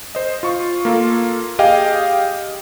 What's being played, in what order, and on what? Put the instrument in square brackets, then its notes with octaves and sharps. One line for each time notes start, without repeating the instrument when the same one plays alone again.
[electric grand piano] C5 D#5
F4 C#6
A#3 F4 A4
G4 G#4 D#5 F5 G5